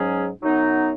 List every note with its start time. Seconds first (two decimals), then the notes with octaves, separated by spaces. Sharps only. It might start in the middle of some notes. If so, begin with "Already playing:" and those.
Already playing: G#2 F#3 C#4 G#4
0.43 F#2 F#3 B3 D#4